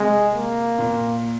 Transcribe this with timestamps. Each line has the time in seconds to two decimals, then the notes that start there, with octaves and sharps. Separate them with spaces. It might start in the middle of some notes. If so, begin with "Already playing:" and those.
Already playing: C3 G#3
0.34 A#3
0.79 A#2